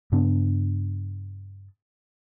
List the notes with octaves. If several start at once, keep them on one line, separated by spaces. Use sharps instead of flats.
G2 C#3 B3 D4